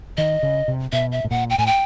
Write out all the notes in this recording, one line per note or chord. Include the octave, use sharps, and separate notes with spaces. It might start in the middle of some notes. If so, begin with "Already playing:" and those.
D#3 D#5
C#3
C3
B2 E5
E5
A2
A#2 F#5
G5
A2 G#5
G5